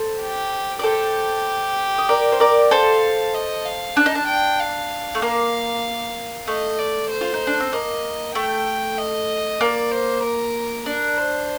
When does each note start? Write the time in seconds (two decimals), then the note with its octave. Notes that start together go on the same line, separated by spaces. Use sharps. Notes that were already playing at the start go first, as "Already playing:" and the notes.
Already playing: A4 C5
0.21 G4
0.79 D5
0.83 G4 A4 C5
1.98 D#5
2.09 A#4 D5
2.32 C5
2.40 A#4 D5
2.71 A4 C5 F5
3.35 D#5
3.66 F5
3.97 D4 A5
4.06 D#4
4.15 D4
4.28 G5
4.60 F5
5.15 A3
5.22 A#3
6.47 A3 D#5
6.78 D5
7.10 C5
7.21 F4
7.34 D#4
7.47 D4
7.60 C4
7.72 A#3 D#5
8.35 A3 G5
8.98 D#5
9.60 A#3 D5
9.91 C5
10.23 A#4
10.86 D4 A#4
11.17 C5